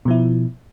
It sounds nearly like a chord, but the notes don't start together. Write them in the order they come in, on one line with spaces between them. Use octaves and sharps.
B2 F3 E4